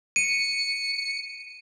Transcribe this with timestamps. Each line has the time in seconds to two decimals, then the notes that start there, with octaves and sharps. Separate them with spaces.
0.16 C#7 D#7